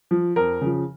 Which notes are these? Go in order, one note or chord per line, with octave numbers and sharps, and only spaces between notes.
F3
F2 A#4
C#3 F3